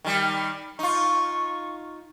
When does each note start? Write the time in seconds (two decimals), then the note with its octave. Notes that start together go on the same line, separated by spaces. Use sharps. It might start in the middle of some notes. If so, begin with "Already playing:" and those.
0.05 D#3 G3
0.79 D#4 F4 C#6